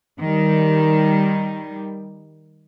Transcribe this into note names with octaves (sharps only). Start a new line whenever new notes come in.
D#3 G3